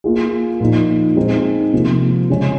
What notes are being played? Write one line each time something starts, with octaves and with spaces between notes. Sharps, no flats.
A#3 F4 G#4
A#2 F3 A#3 D#4
G#3 C4 D#4
C3 F3 A#3
C#3 G#3 C#4